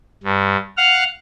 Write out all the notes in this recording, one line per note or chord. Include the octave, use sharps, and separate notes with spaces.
G2
F5 F#5 F6